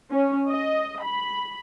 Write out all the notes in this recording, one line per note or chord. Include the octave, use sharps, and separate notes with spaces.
C#4
D#5
B5